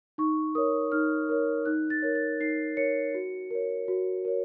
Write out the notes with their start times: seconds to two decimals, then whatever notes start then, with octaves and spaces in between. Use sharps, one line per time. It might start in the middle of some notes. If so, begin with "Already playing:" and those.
0.18 D#4 C#6
0.55 A#4 C#5 D#6
0.92 D#4 F6
1.29 A#4 C#5
1.66 D#4 F#6
1.90 A6
2.02 A#4 C#5
2.15 A6
2.40 D#4 C7
2.77 A#4 C#5 C#7
3.14 F#4
3.51 A#4 C#5
3.88 F#4
4.25 A#4 C#5